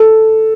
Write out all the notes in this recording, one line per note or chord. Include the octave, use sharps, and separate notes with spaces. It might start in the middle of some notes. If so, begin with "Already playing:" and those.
Already playing: A4